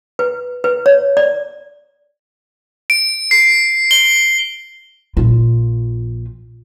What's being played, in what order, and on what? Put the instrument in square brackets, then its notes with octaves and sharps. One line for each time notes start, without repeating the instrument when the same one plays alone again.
[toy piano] B4
B4
C#5
D5
[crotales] D7
C7
G7
[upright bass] A#1 F4